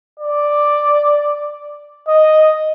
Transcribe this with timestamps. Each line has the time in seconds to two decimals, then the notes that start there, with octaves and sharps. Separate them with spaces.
0.20 D5
2.08 D#5